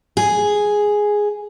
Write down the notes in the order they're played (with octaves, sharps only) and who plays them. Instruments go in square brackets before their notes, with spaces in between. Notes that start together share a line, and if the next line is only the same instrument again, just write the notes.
[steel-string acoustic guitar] G#4